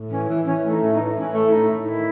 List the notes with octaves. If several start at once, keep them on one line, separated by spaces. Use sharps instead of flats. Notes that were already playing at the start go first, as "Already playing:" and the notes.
Already playing: A2
E3 C#4
E3
E3 C#4
A3
D#4
A2
D#4
E3
E3 C#4
A3
E4
A2 D#4
A2
D#4
D#3 E4